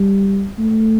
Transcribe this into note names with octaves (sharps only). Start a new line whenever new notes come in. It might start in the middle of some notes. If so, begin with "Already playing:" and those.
Already playing: G3
A3